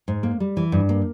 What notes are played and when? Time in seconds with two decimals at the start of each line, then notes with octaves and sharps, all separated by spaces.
0.08 G#2
0.23 A#3
0.40 G3
0.57 E3
0.72 G2
0.89 A#3